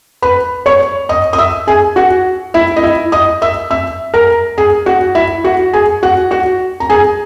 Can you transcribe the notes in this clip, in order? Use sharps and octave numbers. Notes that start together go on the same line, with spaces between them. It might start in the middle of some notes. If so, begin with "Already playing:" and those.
B4 B5
C#5 C#6
D#5 D#6
D#6
E5 E6
G#4 G#5
F#4 F#5
E4 E5
D#5
E4 E5
D#5 D#6
E5 E6
E5 E6
A#4 A#5
G#4 G#5
F#4 F#5
E4 E5
F#4 F#5
G#4 G#5
F#4 F#5
F#4 F#5
A#5
G#4 G#5